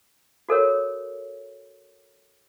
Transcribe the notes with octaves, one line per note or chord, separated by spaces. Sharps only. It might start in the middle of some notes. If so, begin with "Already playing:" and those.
F#4 A4 A#4 C#5